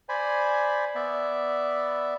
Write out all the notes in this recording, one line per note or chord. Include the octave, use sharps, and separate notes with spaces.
C5 D5 G#5 B5
B3 D5 E5